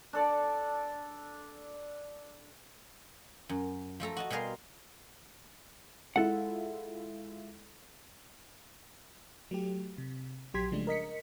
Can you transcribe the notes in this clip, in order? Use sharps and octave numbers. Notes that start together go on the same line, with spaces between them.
D4 A4 D5
F#2
F3 A3 A4 A#5
F#4 D#5 A5
B2 G3 G#4 A#4 F5 C6
G#3 E4 F4 A4 F#5
F#3 A3 G4
C3
A#1 F#3 G4 C6 G#6 B6
C#3 F3 G#3 A3 D4
A#4 D#5 B6 C#7